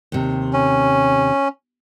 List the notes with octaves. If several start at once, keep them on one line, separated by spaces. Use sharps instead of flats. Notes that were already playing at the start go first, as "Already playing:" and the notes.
D#2 C3
C#4